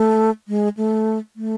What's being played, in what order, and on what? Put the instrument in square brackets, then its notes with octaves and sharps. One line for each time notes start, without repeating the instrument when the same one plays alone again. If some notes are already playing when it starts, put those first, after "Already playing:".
Already playing: [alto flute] A3
G#3
A3
A3